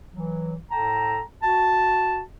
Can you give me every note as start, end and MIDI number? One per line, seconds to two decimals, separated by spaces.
0.14 0.55 52
0.14 0.55 54
0.71 1.21 45
0.71 1.21 69
0.71 1.21 79
0.71 1.21 81
0.71 1.21 82
1.43 2.21 66
1.43 2.21 81